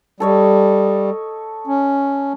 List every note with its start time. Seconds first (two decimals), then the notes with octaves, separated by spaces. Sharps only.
0.20 G3 A4 C#5 D#5
1.67 C#4